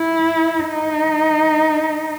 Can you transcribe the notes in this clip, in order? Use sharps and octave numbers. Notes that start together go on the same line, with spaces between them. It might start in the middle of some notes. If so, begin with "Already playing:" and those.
Already playing: E4
D#4